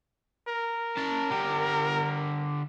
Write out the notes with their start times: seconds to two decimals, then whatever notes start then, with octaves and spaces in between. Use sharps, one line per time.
0.48 A#4
0.97 C#4 A5
1.30 D3 G4